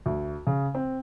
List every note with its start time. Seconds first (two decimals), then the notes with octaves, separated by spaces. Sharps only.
0.06 D2
0.47 C#3
0.75 C4